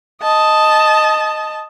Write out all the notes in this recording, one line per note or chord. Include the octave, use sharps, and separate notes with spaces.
D#5 A5